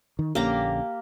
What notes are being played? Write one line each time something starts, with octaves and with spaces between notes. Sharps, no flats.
D#3
A#1 D3 A#3 C#4 G4 A#5